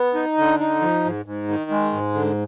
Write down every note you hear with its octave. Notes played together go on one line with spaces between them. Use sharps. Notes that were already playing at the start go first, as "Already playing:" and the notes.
Already playing: B3
D#4
D3
D#4
F3
G#2
G#2
D#3
G#3
G#2
D3